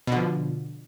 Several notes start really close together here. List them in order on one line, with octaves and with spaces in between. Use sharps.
B2 D3 F3